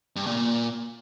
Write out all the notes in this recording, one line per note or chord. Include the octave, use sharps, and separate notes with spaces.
G2
A#2
A#2